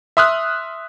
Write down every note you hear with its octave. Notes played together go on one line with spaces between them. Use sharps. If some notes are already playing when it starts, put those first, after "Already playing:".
E5 C6 D#6 F6 F#6